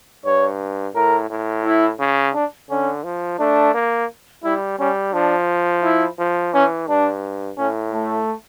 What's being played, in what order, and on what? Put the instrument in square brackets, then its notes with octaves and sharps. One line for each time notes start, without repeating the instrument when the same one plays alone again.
[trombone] G2 [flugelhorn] C#5
[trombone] A2 [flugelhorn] A#4
[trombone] A2
[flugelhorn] E4
[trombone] C#3
[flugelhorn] D4
[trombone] D3 [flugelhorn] C#4
[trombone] F3
[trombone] A3 [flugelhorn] D4
[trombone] A#3
[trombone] G3 [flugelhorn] E4
[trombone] G3 [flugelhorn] C#4
[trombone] F3 [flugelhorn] D4
[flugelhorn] E4
[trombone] F3
[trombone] E3 [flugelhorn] C#4
[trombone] G2 [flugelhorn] D4
[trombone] A2 [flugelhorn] C#4
[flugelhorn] A3